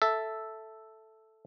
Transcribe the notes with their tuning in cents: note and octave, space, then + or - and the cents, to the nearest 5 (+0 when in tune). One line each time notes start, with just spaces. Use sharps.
A4 +0 E5 +0